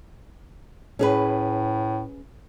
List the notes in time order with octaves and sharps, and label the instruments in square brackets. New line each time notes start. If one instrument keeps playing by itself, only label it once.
[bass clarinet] A2 [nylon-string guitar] C#4 G#4 B4